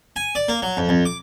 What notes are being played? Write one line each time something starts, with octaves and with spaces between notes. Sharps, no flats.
G#5
D5
A#3
F#3
F2
F2
D6